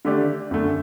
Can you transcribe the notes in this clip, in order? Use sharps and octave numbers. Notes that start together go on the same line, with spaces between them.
D3 A3 D4 G4 D5
F#2 D3 A3